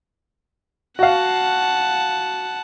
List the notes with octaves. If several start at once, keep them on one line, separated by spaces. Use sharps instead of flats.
F#4 F5 F#5 A5